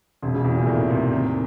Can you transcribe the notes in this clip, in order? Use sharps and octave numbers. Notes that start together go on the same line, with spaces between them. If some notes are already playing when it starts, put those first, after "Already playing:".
E1 C3
C#3
E2 C3
A#2
A2 D#3
C3
D#3